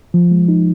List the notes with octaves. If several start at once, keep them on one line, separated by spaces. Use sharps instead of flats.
F3
G#3
D#4